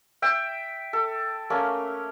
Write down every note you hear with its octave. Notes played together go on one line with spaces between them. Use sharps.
E5 G5
A4
A3 A#3 C#4